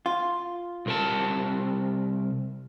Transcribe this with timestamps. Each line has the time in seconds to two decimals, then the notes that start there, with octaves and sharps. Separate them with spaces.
0.06 F4
0.86 C2 A#4 A5